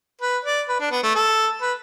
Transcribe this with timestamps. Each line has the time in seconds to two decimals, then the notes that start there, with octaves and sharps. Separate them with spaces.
0.21 B4
0.45 D5
0.69 B4
0.80 D4
0.91 B3
1.03 A3
1.15 A4
1.61 B4